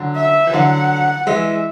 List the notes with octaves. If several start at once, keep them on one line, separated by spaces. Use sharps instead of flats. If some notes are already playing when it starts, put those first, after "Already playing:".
Already playing: D3 F#3
E5
E3
D3 F#3 F#5
E3 G#3 E5